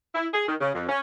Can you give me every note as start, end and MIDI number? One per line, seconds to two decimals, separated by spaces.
0.14 0.27 64
0.34 0.45 68
0.48 0.56 51
0.61 0.70 49
0.74 0.87 41
0.89 1.00 61